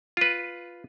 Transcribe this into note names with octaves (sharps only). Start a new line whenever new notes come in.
F4 B4